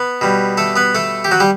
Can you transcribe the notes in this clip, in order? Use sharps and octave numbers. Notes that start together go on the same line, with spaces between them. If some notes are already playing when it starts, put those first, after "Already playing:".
Already playing: B3 B4
B2 G3
A3 A4
B3 B4
A3 A4
G4
F#3 F#4
G3 G4